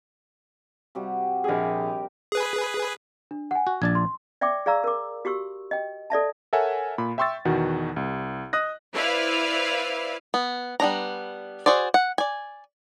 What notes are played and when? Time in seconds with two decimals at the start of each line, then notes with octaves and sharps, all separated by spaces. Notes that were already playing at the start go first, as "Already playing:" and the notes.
0.95 C3 G3 F#4
1.44 A#1 G4 G#4 A#4
2.32 G#4 B4
3.31 D4
3.51 F#5 G#5
3.67 F#4
3.82 A#1 D4 A5 G#6
3.95 C6
4.41 D5 E5 G5 C#6 D6
4.66 G#4 D5 F5 A#5 E6
4.84 A#4 D6
5.25 F#4 G4 C#6 E6
5.71 D#5 G5
6.10 A4 D5 E5 A5
6.53 A4 A#4 C#5 E5 F#5 G#5
6.98 A#2 B5
7.18 E5 G5 C6 C#6 E6 A6
7.45 E2 B2 D#3 F#4
7.96 C2
8.53 D#5 D#6 F#6 A#6
8.94 E4 B4 C5 D5 F5
10.34 B3
10.80 G3 B3 D4 A#5
11.66 F#4 G#4 C5 D5
11.94 F#5
12.18 D5 G#5